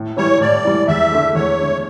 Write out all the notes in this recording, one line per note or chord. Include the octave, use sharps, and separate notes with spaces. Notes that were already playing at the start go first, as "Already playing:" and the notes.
Already playing: A2
E3 G3 C#5
A2 D5
E3 G3
E2 E5
D3 A3
E2 C#5
D3 A3